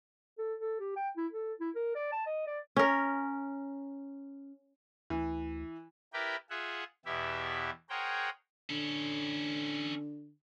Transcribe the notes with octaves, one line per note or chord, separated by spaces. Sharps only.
A4
A4
G4
G5
E4
A4
E4
A#4
D5
A5
D#5
D5
C#4 A#4
D2 E3
E4 G4 A#4 B4 D5 G5
F4 G#4 E5 F#5
E2 B2 E4 G4 E5
G#4 A#4 C5 C#5 F#5 G5
D3 C#4 A4